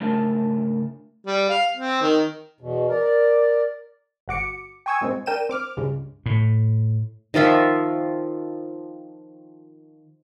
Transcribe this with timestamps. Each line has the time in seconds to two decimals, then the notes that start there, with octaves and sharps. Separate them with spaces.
0.01 G#2 C#3 A3 D4 A#4 A5
1.26 G3
1.49 F5
1.76 C4
2.02 D#3
2.61 E2 B2
2.89 A#4 D5
4.28 G1 F#4 D6 C#7
4.86 G5 G#5 C#6 D#6 E6 G#6
5.01 G2 A#2 G#3 C4
5.26 D4 A#4 G5 D#7 E7
5.49 C4 D6 F6
5.77 C#2 G2 C#3 G#3
6.26 A2
7.34 D#3 F3 F4 E5